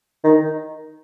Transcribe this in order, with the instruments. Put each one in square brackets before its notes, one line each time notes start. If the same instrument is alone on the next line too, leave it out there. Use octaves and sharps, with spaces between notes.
[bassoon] D#3